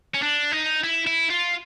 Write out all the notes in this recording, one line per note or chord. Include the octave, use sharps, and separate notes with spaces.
C#4
D4
D#4
E4
E4
F4